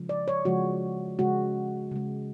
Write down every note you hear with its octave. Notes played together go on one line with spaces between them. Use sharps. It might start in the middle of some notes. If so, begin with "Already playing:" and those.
Already playing: C#3 F3 G#3
D5
C#5
C#3 F3 G#3 F#4
C#3 G#3 F#4
C#3 G#3